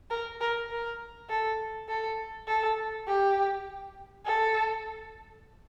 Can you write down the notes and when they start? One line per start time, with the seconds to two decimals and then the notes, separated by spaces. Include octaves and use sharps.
0.10 A#4
0.40 A#4
0.70 A#4
1.29 A4
1.89 A4
2.48 A4
3.07 G4
4.26 A4